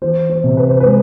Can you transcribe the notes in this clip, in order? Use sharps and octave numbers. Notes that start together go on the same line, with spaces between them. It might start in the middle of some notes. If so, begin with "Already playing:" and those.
E3 C5
C5
C3
B4
C5
G#3 B4